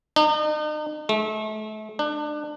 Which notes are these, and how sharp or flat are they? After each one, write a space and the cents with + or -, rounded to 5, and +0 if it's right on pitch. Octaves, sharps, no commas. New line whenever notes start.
D#4 -40
A3 -35
D4 +30